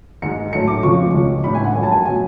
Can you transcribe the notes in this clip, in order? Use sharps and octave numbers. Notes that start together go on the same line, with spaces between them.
G#2 G#3 C#7
A2 F#3 A3 C#7
D6
F2 C#3 F3 G#3 C#6
C#2 C#3 G#3
A2 G#3 B5
G#5
F#5
F#2 F3 A3 G#5
A5
G#5
B2 F#3 A3 G#5